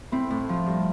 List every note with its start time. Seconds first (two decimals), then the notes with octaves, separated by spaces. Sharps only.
0.12 A2 C4 E4
0.30 A2
0.49 F3
0.66 G2